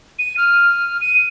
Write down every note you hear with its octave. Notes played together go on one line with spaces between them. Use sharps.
D#7
F6
D#7